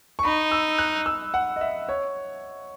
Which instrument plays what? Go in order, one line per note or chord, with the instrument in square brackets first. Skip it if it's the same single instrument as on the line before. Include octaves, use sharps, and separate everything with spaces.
[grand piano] C#6
[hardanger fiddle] D#4 [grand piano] B5
[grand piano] E6
F#6
E6
F#5
D#5
E5
C#5